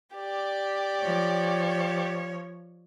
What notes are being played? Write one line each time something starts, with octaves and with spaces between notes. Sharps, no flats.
G4 D5
F3 C#5